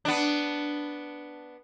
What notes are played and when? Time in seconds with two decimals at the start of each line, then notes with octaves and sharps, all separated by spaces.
0.05 B3 D4